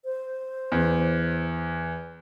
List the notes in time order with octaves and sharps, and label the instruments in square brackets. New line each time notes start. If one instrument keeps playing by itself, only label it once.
[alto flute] C5
[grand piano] E2